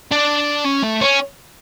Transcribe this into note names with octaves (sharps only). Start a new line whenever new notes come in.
D4
C#4
A3
C#4